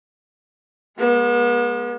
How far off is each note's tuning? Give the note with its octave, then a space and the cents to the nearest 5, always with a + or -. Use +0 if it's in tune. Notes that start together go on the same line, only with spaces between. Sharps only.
G#3 +0 B3 -45